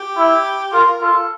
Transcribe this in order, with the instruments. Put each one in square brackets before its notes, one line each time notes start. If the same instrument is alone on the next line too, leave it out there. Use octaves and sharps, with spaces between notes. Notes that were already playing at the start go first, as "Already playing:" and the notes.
Already playing: [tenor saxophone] G4
[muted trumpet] E4
[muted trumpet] F4 [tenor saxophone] A#4
[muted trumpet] F4 [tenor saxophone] A4